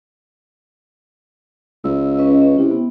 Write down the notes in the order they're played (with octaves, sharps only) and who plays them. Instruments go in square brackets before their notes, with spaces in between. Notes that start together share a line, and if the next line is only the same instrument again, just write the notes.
[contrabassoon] C#2 [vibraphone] E6
[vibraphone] C#4 B4 D#5
C#4
[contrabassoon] C3 [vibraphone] E4
[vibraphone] B3